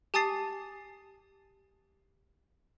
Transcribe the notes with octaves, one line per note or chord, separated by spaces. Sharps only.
G4 G#5 A5 D#6 A6 C7